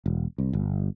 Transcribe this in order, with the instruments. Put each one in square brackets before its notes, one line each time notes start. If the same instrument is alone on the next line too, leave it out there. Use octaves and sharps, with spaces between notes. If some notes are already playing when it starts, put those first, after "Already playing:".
[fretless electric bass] E1
C2
G1